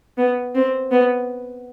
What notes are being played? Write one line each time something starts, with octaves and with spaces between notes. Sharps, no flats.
B3
C4
B3